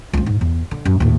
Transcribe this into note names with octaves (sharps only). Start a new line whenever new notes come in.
C#2 C4
G#2
E2
D3
F#2
D#2 A2